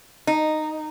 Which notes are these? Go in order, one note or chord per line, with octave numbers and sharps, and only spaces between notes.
D#4